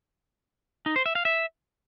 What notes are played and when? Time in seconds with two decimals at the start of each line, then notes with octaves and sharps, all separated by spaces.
0.86 D#4
0.96 C5
1.06 E5
1.15 F5
1.25 E5